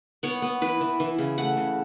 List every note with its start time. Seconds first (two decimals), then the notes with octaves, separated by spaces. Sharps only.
0.23 B3 C#5
0.42 B3
0.61 E3 B4
0.81 E3
1.00 E3
1.18 C#3
1.38 A3 F#5
1.57 C#3